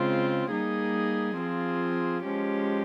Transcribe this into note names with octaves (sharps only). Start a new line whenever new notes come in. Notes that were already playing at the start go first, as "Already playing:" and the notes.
Already playing: C#3 G#3 C4 F4
G3 A#3 D#4 G#4
F3 C4 F4 G#4
F3 G#3 C#4 G4